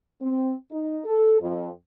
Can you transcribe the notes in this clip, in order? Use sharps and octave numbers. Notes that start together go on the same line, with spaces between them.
C4
D#4
A4
F2